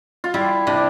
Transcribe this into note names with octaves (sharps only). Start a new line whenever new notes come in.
F4
G3 E4
C3 D4